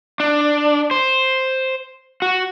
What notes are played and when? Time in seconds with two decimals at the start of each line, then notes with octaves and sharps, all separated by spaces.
0.20 D4
0.91 C5
2.22 F#4